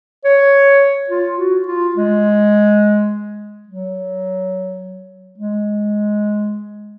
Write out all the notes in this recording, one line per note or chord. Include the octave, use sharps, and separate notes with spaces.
C#5
F4
F#4
F4
G#3
F#3
G#3